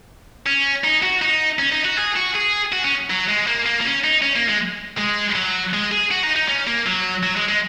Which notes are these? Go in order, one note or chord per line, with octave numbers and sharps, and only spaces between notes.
C#4
D#4
F#4
D#4
C#4
D#4
F#4
G#4
F#4
G#4
F#4
C#4
F#3
G#3
A#3
A#3
A#3
C#4
D#4
C#4
A#3
G#3
G#3
F#3
G#3
G#4
F#4
D#4
D#4
C#4
A#3
F#3
F#3
G#3
G#3